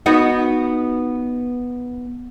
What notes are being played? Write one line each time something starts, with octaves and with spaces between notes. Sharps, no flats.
B3 D#4 F#4